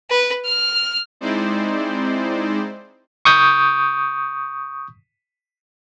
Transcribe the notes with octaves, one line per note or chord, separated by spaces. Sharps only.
B4
F6
G#3 C4 D#4 E4 C5 D5
C#6 D#6 G6